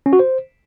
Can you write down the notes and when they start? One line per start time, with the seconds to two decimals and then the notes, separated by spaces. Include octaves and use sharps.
0.06 C#4
0.13 F#4
0.19 C5